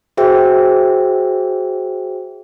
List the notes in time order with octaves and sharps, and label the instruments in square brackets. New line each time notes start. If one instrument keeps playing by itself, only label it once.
[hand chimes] F#4 G#4 C5 E5 G5